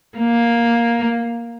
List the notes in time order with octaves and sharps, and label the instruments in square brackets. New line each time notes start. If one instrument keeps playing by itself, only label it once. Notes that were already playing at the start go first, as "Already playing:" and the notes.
[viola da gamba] A#3